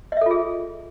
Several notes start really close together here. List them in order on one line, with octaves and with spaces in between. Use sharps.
D#5 E5 A4 F4 G#4